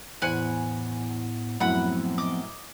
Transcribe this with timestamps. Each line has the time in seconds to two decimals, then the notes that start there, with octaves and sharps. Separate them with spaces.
0.22 E2 A2 B3 C5 G#5 B5 F#6 C#7
1.60 F#2 A2 F3 B3 C4 F#5 B5
2.18 D#5 D6